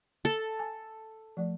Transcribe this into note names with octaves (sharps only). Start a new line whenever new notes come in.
A4
G#5
F3 A3 D5